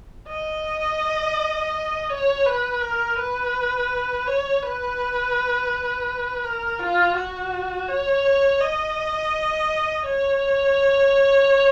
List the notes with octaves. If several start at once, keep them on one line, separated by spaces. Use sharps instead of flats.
D#5
C#5
B4
A#4
B4
C#5
B4
A#4
F4
F#4
C#5
D#5
C#5